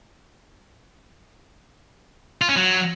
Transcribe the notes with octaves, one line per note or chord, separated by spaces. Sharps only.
F4
C#4
F#3